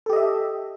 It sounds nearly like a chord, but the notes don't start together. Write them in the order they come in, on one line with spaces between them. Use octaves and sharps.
A4 G4 D#5 E5